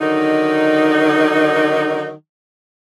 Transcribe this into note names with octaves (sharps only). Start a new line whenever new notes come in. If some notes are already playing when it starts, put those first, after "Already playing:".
D3 D#3 F#3 D#4